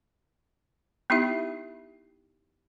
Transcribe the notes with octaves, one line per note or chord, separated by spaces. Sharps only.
B3 D#4 E4 G4 E5